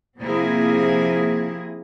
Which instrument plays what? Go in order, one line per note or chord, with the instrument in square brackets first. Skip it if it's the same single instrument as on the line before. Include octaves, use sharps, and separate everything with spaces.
[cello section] C3 F3 A#3 C4 E4 G#4